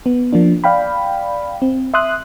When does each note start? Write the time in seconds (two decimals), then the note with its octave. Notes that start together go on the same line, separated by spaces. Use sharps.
0.06 B3
0.33 F3 A#3 D4
0.64 D5 F5 G5 B5
1.62 C4
1.94 E5 C6 D#6 F#6